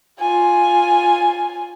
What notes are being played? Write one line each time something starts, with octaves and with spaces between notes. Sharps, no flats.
F4 G#5